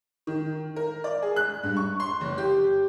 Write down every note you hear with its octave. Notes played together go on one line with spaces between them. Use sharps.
D#3
A#4
D5
G#4
F#6
G2
C#6
C6
F#1
G4